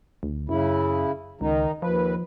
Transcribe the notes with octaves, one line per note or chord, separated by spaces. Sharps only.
D2
F#2 C#3 E4
C#2 D#3 D#4
D#2 F3 B4